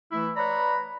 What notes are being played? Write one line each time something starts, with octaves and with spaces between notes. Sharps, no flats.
E3 A3 E4
B4 C#5 D5 A#5 B5